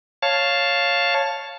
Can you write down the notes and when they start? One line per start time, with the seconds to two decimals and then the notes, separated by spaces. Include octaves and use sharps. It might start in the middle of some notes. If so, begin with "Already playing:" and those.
0.22 C#5 F5 A5